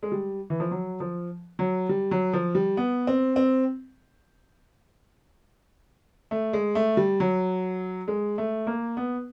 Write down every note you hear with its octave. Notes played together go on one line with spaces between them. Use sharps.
G#3
G3
E3
F3
F#3
F3
F#3
G3
F#3
F3
G3
B3
C4
C4
A3
G#3
A3
G3
F#3
G#3
A3
A#3
B3